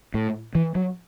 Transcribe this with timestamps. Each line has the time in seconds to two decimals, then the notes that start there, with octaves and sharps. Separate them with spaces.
0.14 A2
0.55 E3
0.75 F#3